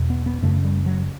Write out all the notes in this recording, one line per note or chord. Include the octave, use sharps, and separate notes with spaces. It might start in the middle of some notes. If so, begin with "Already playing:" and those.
Already playing: E2 B2
B3
B3
F#2 C#3 A3
G3
F#3